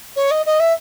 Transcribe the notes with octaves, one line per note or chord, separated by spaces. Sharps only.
C#5
D#5
D#5
E5